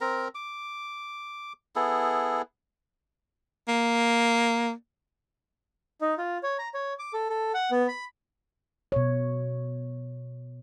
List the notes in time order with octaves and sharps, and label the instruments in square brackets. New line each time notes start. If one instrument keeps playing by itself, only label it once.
[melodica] C4 A#4 A#5
D6
B3 E4 G#4 A4
[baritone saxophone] A#3
[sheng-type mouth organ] D#4
F4
C#5
A#5
C#5
D6
A4
A4
F#5
B3
B5
[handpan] B2 C#5